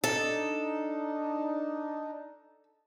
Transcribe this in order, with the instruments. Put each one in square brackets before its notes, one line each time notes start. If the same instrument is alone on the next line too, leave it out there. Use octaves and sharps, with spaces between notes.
[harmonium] D4 D#4 [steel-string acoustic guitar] A4